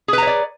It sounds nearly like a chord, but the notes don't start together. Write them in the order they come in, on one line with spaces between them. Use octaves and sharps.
G#4 B4 A#5 C#5 D5